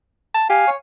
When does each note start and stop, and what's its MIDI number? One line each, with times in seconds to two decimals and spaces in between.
0.34 0.47 81
0.50 0.64 67
0.50 0.70 77
0.50 0.70 80
0.68 0.75 73